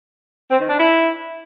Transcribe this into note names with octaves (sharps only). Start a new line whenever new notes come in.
C4
D#3
D4
E4